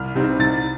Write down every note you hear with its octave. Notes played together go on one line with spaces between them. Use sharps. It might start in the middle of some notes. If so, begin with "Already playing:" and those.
Already playing: C2 F6
C3 G3 C4 D#4
C2 A6